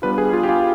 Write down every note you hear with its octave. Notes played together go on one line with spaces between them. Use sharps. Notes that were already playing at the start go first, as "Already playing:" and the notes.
G3 B3 D4 F4 B4
G#4
F4
G4
F4